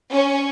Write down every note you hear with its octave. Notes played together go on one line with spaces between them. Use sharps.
C#4